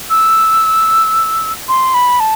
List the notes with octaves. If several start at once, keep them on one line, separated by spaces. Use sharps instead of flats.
E6
C6
B5
A5